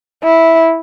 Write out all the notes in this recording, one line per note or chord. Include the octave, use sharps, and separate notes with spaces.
E4